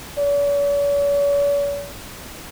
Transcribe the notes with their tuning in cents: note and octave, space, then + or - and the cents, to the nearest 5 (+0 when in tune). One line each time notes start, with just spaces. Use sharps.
C#5 +45